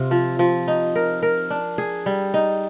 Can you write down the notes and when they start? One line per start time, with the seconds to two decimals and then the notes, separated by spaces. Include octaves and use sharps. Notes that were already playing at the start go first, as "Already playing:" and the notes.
Already playing: C3 F4
0.11 F3
0.39 F3
0.68 D#4
0.95 A#4
1.23 A#4
1.50 D4
1.78 G#4
2.06 G3
2.34 D#4